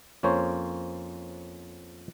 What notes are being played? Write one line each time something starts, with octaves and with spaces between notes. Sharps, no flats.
F2 A#3 C#4 C5 C#5